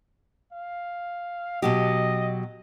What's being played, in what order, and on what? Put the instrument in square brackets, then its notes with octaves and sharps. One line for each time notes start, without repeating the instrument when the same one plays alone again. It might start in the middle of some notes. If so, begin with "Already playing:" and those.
[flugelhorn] F5
[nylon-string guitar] B2 F#3 G4 [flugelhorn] D#5